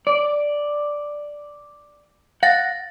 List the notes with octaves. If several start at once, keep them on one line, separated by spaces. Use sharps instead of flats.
D5
F5 F#5 A6 A#6